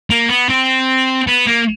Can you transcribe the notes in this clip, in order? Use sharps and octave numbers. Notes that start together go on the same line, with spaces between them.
A#3
B3
C4
B3
A#3